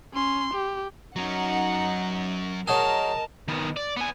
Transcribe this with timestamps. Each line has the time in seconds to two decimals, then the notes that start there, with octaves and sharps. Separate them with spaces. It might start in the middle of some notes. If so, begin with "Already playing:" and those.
0.13 C#4 C6
0.54 G4
1.16 F#3 C#4 D#4 F#5
2.68 F#3 D#4 G#4 A#4 D#5 A5
3.48 D#3 B3
3.77 D5
3.97 B3 G#5